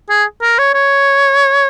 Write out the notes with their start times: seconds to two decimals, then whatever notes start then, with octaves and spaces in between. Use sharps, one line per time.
0.09 G#4
0.42 A#4
0.58 C#5
0.74 C#5